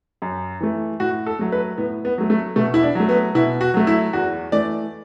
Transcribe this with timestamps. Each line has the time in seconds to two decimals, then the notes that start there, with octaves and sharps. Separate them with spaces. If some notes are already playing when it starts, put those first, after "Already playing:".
0.22 F#2
0.60 E3 A3
1.00 A2 F#4
1.26 A4
1.39 F#3 A3
1.52 B4
1.78 A2 B3
2.05 B3
2.18 F#3 A3
2.30 A3
2.56 B2 A3
2.74 E4
2.82 D4
2.95 F#3 A3
3.09 B3
3.35 B2 E4
3.61 F#4
3.74 F#3 A3
3.87 E4
4.13 E2 F#4
4.52 E3 A3 D5